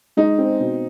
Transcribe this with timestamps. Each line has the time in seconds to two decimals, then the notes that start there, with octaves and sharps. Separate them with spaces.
0.17 G#3 D#4
0.38 C4
0.60 B2